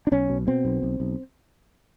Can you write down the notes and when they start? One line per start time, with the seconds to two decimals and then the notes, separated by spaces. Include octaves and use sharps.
0.07 D4
0.12 B1 C#4
0.29 B2
0.47 B2 C4
0.65 B1
0.83 B1
1.00 B1